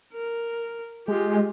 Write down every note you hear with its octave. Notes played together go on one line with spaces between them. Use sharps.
A#4
G#3 F4 G4